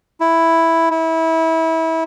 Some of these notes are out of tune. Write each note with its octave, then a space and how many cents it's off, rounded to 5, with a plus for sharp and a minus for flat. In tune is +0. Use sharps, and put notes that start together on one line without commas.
E4 +0
E4 -25